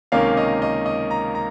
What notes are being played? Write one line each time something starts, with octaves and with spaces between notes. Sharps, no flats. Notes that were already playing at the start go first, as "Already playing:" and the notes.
C#2 C3 D#3 A#3 C#4 F5
D#5
D#5
D#5
A#5
A#5